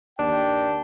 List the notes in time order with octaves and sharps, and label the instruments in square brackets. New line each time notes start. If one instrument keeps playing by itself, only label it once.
[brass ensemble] D#2 G5 [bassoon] D4